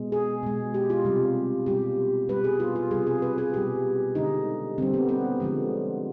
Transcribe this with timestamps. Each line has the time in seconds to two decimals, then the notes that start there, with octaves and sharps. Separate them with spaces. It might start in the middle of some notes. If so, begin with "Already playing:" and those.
Already playing: B2 G#3
0.12 G#4
0.43 B2 G#3
0.74 G4
0.90 F4
1.05 C3 G3
1.66 B2 G3 G4
2.29 B2 G3 B4
2.44 G#4
2.60 F4
2.76 F4
2.91 C3 G3 G#4
3.07 G#4
3.22 B4
3.38 G#4
3.54 B2 G3 G4
4.15 D3 G#3 D#4
4.78 D3 G3 C4
4.94 B3
5.09 B3
5.40 D3 F3 G#3